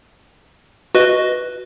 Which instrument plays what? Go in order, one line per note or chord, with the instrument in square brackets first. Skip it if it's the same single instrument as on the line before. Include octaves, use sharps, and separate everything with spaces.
[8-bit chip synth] F#4 B4 D#5